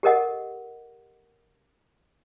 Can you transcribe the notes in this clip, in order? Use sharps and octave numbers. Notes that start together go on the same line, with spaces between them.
G4 A4 A#4 D#5 F#5